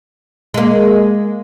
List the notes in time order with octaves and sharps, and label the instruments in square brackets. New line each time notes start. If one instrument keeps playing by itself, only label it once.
[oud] G#3 A#3